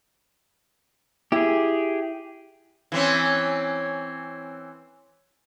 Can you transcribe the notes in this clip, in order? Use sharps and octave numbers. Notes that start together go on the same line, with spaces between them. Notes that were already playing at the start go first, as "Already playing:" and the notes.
E4 G4 G#4
E3 C4 C#4